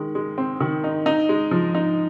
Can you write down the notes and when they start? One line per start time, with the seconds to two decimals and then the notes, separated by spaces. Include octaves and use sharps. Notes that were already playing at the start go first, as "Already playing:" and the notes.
Already playing: D#3 G#3
0.15 G#3
0.38 C4
0.60 D#3
0.84 D#4
1.06 D#4
1.29 G#3
1.51 F3
1.75 D#4